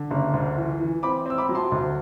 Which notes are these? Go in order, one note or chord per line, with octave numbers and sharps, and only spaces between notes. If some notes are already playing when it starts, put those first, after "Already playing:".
Already playing: D3
F#1
D2
E3
E3
C4 B5 D6
C4 E6
B5 D6
F#3
A5 C6
D2